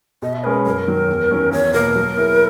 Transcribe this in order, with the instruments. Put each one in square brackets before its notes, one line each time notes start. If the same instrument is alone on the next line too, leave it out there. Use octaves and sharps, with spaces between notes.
[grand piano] B2 [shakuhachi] D#5
[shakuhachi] E5
[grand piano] G#3 C#4 G#4 B4 [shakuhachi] A#4
[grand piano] F#2 [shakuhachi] A#4
[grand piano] D#3 F#3
E2
D#3 F#3 C#4
[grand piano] E2 [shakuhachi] C#5
[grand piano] B2 A#3 [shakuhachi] A#4
[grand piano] F#3
B3 E4 G#4